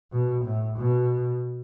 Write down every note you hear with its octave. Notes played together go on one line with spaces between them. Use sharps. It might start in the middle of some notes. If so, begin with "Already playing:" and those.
B2
A2
B2